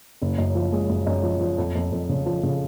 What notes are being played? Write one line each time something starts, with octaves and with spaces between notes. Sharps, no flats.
F#1
F#2
F3
G#3
F#2
F#2
F3
F3
F2
F2
F2
C#3
F3
C#3